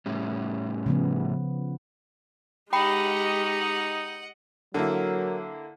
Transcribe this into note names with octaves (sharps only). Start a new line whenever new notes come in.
A2 G3 C#4
C#3 F3 B3
G#3 D#4 G4 D#5 F#5 G5 B5 C#7
D3 F#3 A#3 E4 A#4